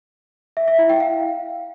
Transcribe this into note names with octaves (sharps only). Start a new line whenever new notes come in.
E5
E5
E4
G5
F5